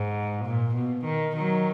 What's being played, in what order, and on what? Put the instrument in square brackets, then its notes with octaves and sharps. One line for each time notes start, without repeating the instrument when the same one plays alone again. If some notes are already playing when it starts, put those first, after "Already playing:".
Already playing: [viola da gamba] G#2
A#2
B2
D#3
D#3 F#3